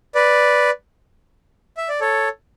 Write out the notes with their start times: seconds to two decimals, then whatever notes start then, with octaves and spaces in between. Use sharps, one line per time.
0.15 B4 D5
1.77 E5
1.89 D5
2.01 A4 C#5